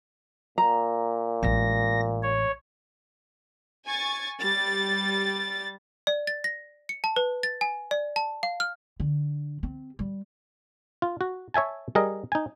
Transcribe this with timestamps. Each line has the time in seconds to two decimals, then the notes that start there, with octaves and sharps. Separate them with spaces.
0.58 A#2 A#5
1.43 A1 G#3 A#6
2.23 C#5
3.87 G#5 C#6 G#6 A6
4.40 G3 A6
6.07 D5
6.27 A6
6.44 A#6
6.89 C#7
7.04 A5
7.16 B4
7.43 A6
7.61 G#5
7.91 D5
8.16 A5
8.43 F5
8.60 F6
9.00 D3
9.63 C4
9.99 G3
11.02 F4
11.21 F#4
11.54 C#5 E5 G#5 A5
11.95 G3 G#4 A#4 D#5
12.32 D#4 G#5